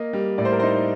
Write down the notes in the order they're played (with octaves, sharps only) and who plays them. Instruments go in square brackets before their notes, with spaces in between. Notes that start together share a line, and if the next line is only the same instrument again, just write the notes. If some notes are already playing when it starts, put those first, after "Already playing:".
Already playing: [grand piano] A#3 D#5
G3
A2 D5
C5
A#4
D#4 C5